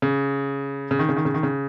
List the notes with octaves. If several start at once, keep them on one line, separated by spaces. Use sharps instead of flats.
C#3
C#3
D#3
C#3
D#3
C#3
D#3
C#3